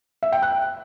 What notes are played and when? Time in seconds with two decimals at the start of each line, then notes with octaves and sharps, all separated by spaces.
0.23 E5
0.32 G5
0.42 F#6